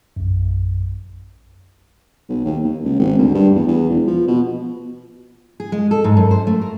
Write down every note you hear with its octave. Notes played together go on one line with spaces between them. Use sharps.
A#1 F#2
B1
D#2
D#2
C#2
G#1
D2
G2
E2
E2
E1
F3
B2
G#4
G#3
A4
G#2
F#2
C5
A3
A#4